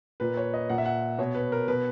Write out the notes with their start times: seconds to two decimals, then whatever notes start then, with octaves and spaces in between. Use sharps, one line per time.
0.20 A#2 B4
0.37 C#5
0.54 D#5
0.69 A#2 F#5
0.78 E5
0.86 F#5
1.18 B2 C#5
1.35 B4
1.52 A#4
1.68 B2 B4